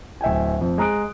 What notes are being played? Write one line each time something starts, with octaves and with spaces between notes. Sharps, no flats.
D1 E5 G5 G#5
F2
G#3 A#5 D#6 F#6 D7